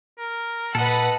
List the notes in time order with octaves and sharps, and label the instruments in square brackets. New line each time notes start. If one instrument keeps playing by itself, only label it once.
[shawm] A#4
[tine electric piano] A#2 [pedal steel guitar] A4 D#5 [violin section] B4 F#5